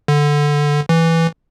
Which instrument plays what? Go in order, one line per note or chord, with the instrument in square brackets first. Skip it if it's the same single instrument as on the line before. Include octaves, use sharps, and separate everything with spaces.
[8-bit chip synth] D3
E3